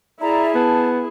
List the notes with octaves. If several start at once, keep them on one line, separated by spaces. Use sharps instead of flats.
E4 G#4 D5 E5 A#5
B3 A5